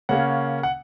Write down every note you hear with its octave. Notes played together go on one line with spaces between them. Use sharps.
C#3 A#3 C#4 F#5
F#5